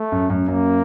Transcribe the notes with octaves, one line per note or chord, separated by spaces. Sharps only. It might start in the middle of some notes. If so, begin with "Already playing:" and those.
Already playing: A3
F#2
F#2
F#2 A#3